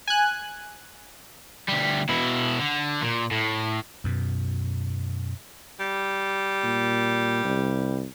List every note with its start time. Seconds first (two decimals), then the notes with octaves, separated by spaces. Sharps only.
0.08 G#5 F#6
1.69 D2 G3
2.09 B2 E4
2.59 D3
3.02 A#2
3.31 A2
4.04 F#2 B2
5.80 G3
6.64 A#2
7.45 C2